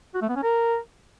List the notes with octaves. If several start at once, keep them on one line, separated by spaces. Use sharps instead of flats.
F#4
A3
B3
C#4
A#4